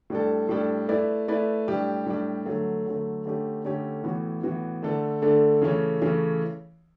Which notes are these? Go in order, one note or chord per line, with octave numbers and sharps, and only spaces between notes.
A2 G3 D4 A4
A2 G3 D4 A4
A3 E4 B4 D5
A3 E4 B4 D5
A2 G3 D4 G4
A2 G3 D4 G4
D3 F#3 A3
D3 F#3 A3
D3 A3 C#4 G4
D3 A3 C#4 G4
A2 E3 B3 F#4
A2 E3 B3 F#4
D3 A3 D4 A4
D3 A3 D4 A4
C#3 E3 A3 C#4
C#3 E3 A3 C#4